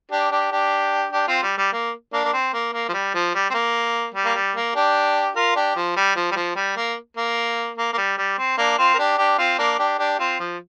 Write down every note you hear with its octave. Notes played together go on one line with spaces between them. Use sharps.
D4 G4
D4 G4
D4 G4
D4 G4
C4 F4
G3
G3
A#3
A#3 D4
A#3
C4
A#3
A#3
F3
G3
F3
G3
C4
A#3
G3
A#3
G3
A#3
D4 G4
F4 A#4
D4 G4
F3
G3
F3
G3
F3
G3
A#3
A#3
A#3
A#3
G3
G3
C4
A#3 D4
C4 F4
A#4
D4 G4
D4 G4
C4 F4
A#3 D4
D4 G4
D4 G4
C4 F4
F3